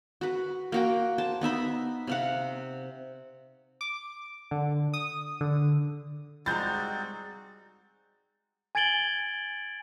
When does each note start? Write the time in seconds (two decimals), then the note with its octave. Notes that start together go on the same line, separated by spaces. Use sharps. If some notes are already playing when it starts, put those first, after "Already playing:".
0.21 F#4 B4
0.72 A#3 F#4 G5
1.18 C5 A5
1.41 B3 D#4 E5 B5
2.07 C3 F5 F#5
3.81 D6
4.51 D3
4.94 D#6
5.41 D3
6.46 G3 G#3 C4 D#4 F#4 A#5 G6 A6
8.75 G#5 G#6 A6 D7 F#7 G7